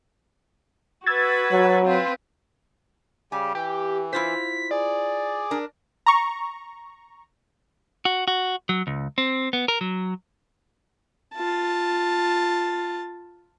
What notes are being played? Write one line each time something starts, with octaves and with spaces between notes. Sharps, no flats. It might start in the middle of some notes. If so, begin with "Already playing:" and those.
F#4 B4 E6 G#6 A6
F#3
C4 F4 B4
C#3 G3 G4 G#5
E3 G4
E4 F4 C5 B6
G#4 D5
D4 A#4
A#5 C#6
F#4
F#4
F#3
C#2
C4
B3
A#4
F#3
F4 A5